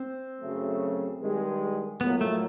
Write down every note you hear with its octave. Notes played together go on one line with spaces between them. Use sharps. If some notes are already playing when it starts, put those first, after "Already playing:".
Already playing: C4
F#2 C#3 F#3 A3
G2 D#3 G#3
A#1 A2 F#3 A#3 B3
A3